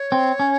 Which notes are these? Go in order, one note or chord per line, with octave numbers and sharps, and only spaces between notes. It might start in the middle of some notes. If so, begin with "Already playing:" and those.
Already playing: C#5
C4
C#4